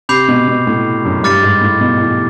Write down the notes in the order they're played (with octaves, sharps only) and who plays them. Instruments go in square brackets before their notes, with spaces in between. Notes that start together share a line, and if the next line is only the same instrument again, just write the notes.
[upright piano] C3 [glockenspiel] B5 D6 G6 C7 F7
[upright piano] B2
B2
A2
F#2
[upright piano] G2 [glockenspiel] D6 F6 A6 C#7
[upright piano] G#2
A2
B2
E3